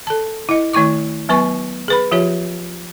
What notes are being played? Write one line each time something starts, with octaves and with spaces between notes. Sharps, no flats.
A4 A5
E4 D#5
D#3 A3 E4 C#6 D6
F#3 B3 B4 G#5 C#6
G#4 B4 B5
F3 F4 G4 C#5